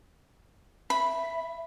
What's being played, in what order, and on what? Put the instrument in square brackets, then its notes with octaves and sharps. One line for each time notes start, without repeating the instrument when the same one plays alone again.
[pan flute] E5 [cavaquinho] B5